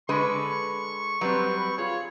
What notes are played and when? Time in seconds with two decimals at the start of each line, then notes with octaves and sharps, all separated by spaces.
0.09 D3 G#3 B4 B5 C#6
1.21 F#3 G3 C4 B4
1.58 B5
1.78 F4 G#4 C#5